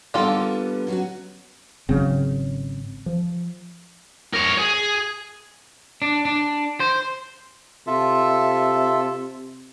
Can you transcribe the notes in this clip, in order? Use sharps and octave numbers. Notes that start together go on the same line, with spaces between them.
D3 G3 A#3 B3 F4 A4
F#3 C#4 F#4
G#1 C#3 F#3 C4
F3
A#4 C#5
G#4
D4
D4
C5
C3 F4 A4 E5